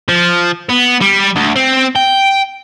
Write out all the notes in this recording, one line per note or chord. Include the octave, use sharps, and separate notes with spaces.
F3
B3
G3
D2
C4
G5